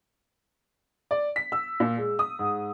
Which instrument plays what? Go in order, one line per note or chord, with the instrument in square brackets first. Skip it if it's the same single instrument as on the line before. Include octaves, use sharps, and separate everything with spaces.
[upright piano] D5
B6
E6
A#2
G#3
D#6
G#2